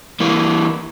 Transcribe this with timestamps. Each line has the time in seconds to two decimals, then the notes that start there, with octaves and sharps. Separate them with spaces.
0.20 E3 A#3